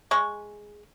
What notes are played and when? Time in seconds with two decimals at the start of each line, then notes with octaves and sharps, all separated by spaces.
0.11 G#3 C#6